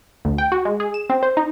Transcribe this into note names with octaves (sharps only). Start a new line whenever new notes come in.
D2
G5
F#4
G#3
G#4
E7
C4
C5
D#4